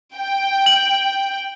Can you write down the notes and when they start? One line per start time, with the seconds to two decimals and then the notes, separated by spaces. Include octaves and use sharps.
0.15 G5
0.66 F#7